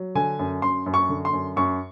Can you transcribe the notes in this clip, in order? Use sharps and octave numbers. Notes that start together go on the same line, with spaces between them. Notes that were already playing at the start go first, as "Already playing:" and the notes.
Already playing: F#3
D3 G#5
F#2
F#2 C6
F#2
C#6
D3
C6
F#2
F#2 C#6